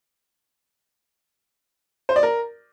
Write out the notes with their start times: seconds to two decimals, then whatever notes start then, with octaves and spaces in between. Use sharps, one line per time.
2.09 C5
2.16 D5
2.23 A#4